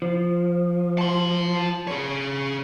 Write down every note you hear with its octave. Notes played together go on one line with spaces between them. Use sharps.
F3
A5 C6
G#4 C#5